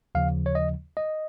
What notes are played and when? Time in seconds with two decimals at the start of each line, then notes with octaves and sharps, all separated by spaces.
0.15 D#2 C#3 F3 F5
0.46 C#5
0.55 D#5
0.97 D#5